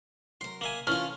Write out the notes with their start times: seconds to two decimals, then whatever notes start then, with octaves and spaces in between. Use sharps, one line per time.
0.41 F#2 A#4 C6
0.61 A#3 E5 G#5
0.87 E3 A3 C#4 F4 F6